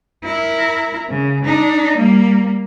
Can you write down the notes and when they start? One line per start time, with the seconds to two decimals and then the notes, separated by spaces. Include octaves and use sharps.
0.24 E4 A#4
1.10 C#3
1.45 D4 D#4
1.97 G3 A#3